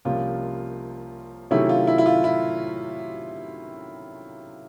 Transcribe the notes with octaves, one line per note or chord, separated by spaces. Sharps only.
C2 C3 F3 A#3 C#4 F4
C3 D#3 F#3 A3 C#4 E4
F4
E4
E4
F4
E4